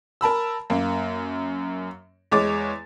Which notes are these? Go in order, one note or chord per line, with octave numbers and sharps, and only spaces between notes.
A#4 A5 B5 E6
F#2 A#3
E2 G#3 C#5 D6 A6